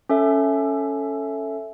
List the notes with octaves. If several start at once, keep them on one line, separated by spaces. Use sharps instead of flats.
C#4 A4 E5